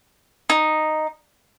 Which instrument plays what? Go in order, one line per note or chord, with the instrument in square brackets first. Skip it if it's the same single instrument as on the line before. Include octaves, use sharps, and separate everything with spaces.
[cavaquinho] D#4